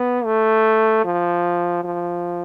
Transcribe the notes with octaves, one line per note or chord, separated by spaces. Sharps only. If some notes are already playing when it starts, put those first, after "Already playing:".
Already playing: B3
A3
F3
F3